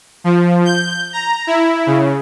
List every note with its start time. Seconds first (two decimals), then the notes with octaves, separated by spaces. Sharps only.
0.24 F3
0.65 G6
1.13 A#5
1.47 E4
1.87 C#3